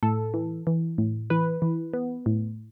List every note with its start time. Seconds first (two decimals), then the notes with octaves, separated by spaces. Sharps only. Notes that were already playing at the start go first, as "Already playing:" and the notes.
0.03 A2 A4
0.34 E3
0.67 E3
0.98 A2
1.30 E3 B4
1.62 E3
1.94 B3
2.26 A2